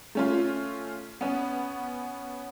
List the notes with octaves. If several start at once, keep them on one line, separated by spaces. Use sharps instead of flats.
A3 C#4 F4
B3 C#4